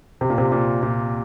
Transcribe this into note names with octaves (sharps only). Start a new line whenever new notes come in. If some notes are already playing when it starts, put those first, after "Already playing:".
C3
A#2
C3
A#2
A#2